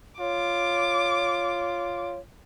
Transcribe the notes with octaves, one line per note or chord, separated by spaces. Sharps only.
F4 C#5 D6